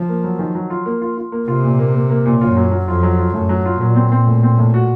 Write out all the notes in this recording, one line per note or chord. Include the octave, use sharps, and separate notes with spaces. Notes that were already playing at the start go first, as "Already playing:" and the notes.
Already playing: F3
A#3
F#3
D#3
F#3
F4
A#3
F4
F4
A#3
C3 F4
A#2
A#3
A#3
A#3
A#2
F#2 F4
F#3
F#3
F2 F4
F#3
F4
F#2 A2
F#3
F4
A#2 F#3
C4
C4
A2
C4
A2
F#4